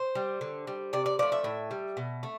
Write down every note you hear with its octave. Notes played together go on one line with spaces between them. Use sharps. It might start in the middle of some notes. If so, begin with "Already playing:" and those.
Already playing: C5
G3
D3
G3
C3 D5
D5
F3 A3 D5
E5
A2
G3
B2
A3